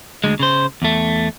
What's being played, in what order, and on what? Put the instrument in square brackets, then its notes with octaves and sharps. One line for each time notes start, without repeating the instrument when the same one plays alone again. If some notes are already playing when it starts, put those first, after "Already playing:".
[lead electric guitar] D2 G#3
C#3 C5
E2 A3